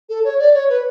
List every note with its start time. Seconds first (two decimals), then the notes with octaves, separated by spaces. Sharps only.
0.09 A4
0.24 C#5
0.39 D5
0.54 C#5
0.69 B4